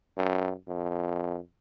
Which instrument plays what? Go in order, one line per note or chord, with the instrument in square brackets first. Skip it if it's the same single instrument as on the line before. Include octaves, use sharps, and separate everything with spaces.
[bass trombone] F#2
F2